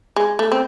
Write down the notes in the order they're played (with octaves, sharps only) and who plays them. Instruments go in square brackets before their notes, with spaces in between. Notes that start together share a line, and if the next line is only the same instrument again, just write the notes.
[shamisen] G#3
A3
C4